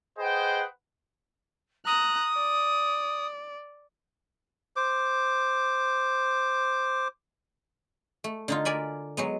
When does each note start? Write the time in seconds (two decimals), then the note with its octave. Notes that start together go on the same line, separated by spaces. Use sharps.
0.18 G#4 B4 C5 D#5 F#5 G5
1.86 A#5 D#6 F#6
2.34 D5
4.76 C5 D6
8.24 A3
8.48 D3 D#4 F4
8.65 A#4 D5 G#5 B5
9.17 F#3 G#3 B3